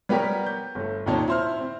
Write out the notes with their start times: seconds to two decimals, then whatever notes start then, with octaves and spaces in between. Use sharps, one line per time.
0.09 G3 B3 G4 A#4 C#5
0.46 G6
0.75 G1 A3
1.06 D#2 A#2 C4 D#4 C#5 A5
1.28 E4 C5 F6
1.60 C4